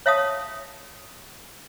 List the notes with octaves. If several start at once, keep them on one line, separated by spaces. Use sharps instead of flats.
C#5 E5 F5 A5 D#6